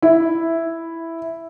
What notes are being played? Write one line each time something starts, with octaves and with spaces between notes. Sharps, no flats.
E4